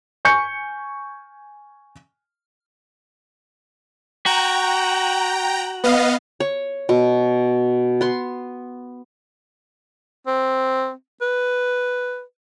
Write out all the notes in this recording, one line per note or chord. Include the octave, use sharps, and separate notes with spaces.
G#5 C#6 G6 C#7
F#4 G5 A#5
B3 D#5 F5
C#5
B2
B3 C6
C4
B4